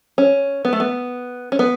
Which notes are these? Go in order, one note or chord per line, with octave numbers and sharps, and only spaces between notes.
C#4
B3
A3
B3
C#4
B3